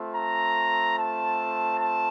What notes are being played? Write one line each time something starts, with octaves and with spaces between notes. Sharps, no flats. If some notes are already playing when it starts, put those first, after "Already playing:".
Already playing: A3 C4 F4
A#5
A5
A5